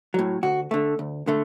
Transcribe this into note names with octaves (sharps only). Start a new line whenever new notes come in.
A2 F#3
D2 F#4
D3 A3
D2
D3 A3